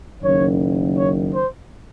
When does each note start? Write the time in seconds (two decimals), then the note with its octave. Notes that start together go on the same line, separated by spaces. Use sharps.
0.22 F#1 F#2 D#3 C#5
0.97 C#5
1.35 C5